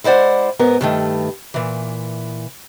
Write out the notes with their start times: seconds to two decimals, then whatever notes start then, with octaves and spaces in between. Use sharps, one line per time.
0.04 G#3 E4 C5 D5 F#5
0.59 G#2 B3 A#4
0.81 G2 D#3 A3
1.54 A#2 E3